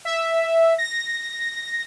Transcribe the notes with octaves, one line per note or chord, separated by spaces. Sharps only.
E5
A#6